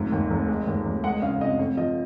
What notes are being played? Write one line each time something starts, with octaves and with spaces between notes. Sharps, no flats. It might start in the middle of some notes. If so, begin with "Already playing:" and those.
Already playing: F1 G#2
D#2
F1
G#3
D#2
F1
G#3 F#5
C#3 F5
F2 D#5
F2 C#5
F3 D#5